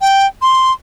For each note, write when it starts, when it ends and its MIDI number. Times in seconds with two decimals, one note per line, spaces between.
0.01 0.26 79
0.42 0.72 84